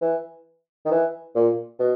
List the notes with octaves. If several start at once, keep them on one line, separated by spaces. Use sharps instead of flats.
E3
D#3
E3
A#2
B2